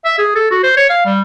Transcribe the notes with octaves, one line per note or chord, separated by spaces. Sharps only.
E5
G#4
A4
F#4
C5
C#5
F5
G3